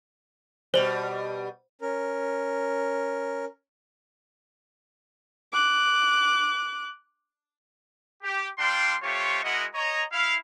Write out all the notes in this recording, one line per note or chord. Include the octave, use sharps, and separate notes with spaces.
B2 G3 C5 F#7
C#4 A#4
D6 F#6
G4
G3 D4 F5 G5 C6
A3 F4 G4 C5 C#5 C#6
G#3 E4 F#4 A#4 D#5 F#5
C#5 D#5 A#5
E4 F5